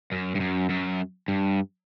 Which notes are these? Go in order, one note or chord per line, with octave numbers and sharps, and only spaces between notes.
F#2
G2
F#2
F#2
G2